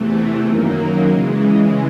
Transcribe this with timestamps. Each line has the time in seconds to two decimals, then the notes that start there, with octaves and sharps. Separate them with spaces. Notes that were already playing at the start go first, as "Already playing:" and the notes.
Already playing: E2 C3 E3 A3
0.45 F#2 D#3 F#3 A#3
1.09 C#3 E3 G#3